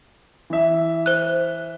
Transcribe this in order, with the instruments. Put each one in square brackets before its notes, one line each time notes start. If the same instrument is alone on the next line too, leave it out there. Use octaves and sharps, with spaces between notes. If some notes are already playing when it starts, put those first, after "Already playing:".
[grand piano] E3 E5
[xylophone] C5 F#6